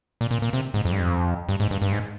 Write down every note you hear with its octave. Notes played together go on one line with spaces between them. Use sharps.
A#2
A#2
A#2
C3
G#2
F2
G2
F2
G2
G#2
G2
G2
G#2